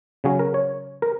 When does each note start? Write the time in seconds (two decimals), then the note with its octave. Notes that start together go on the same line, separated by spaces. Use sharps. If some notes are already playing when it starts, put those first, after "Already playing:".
0.24 C#3 F#3 C#4 G#4
0.39 A#4
0.54 C#5
1.02 A#4